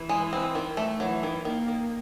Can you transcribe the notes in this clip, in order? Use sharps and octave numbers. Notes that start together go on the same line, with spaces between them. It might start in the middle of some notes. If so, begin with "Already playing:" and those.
Already playing: E3
G#3
C4
D#3
A3
E3 F#3
D#3
D#3 A#3
D#3